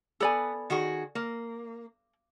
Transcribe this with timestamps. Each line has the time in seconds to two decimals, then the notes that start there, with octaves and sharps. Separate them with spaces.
0.20 B3 A4 D5 G#5
0.70 D#3 F#4 G#4
1.15 A#3